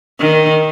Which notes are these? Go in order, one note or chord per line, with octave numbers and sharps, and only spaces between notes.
D#3